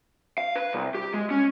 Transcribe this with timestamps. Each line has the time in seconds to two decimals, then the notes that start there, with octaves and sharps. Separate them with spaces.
0.38 F5
0.56 B4
0.73 C2
0.95 G4
1.14 G#3
1.31 C#4